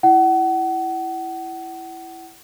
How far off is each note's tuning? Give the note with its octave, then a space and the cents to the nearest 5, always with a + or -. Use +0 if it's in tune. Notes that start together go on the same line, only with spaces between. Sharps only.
E4 +10 F#5 +30